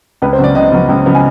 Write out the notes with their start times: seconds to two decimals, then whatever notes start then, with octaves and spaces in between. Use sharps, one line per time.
0.22 C#2 B4
0.33 C5
0.39 C#3 F#3 B3 D5
0.55 C#2 D#5
0.72 C#3 F#3 B3
0.89 C#2
1.06 C#3 F#3 B3
1.15 G#5